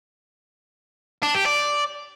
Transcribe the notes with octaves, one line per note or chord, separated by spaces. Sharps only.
D4
G4
D5